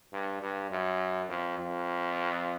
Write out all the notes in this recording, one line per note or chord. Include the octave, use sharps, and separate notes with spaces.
G2
G2
F#2
F2
F2